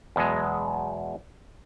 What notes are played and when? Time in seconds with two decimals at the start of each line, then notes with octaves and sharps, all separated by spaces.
0.16 E2 B2 F#3 G#3